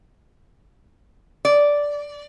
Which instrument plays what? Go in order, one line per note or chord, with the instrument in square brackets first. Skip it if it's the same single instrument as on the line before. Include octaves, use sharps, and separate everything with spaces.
[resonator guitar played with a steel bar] D5